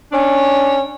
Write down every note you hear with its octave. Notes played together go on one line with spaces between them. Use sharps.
C#4 D4